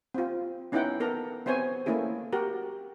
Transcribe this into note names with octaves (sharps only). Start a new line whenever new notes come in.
C4 F4
B3 C#4 D#4 E4 F#5 G5
B3 A4 A#4 A#5
B3 C4 C5 C#5 G#5
A3 A#3 C#4 E4 G#4
F#4 G4 A#4